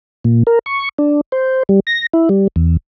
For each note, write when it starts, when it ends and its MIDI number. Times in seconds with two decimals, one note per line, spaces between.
0.25 0.43 46
0.47 0.59 70
0.66 0.89 85
0.98 1.21 62
1.32 1.63 72
1.69 1.80 55
1.87 2.06 94
2.13 2.29 64
2.29 2.47 55
2.56 2.77 40